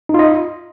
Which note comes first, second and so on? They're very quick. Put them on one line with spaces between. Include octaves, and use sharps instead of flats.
D#4 F4 D#5